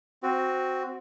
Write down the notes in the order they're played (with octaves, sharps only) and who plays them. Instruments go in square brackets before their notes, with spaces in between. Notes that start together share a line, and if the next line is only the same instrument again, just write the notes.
[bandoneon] C4 F#4